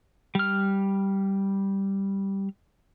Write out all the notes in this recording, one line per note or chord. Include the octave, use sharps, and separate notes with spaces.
G3 F6